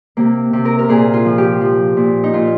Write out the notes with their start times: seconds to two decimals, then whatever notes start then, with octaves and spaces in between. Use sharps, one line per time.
0.17 C3 A#3
0.53 C3
0.65 A#4
0.79 A#4
0.89 A#2 G#4
1.13 F4
1.25 F3
1.38 G4
1.61 F3
1.97 A#2
2.24 D#4
2.34 A#2 F4